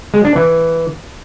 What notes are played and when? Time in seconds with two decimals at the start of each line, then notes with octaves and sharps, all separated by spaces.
0.14 G#3
0.25 D4
0.36 E3